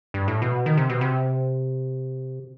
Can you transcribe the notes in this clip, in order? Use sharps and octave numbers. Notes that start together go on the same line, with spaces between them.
G2
A2
B2
D#3
C3
B2
C3